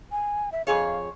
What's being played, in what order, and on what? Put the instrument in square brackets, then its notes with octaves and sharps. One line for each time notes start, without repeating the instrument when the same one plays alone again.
[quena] G#5
E5
[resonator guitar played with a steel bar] F2 G#4 C#5 [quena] F5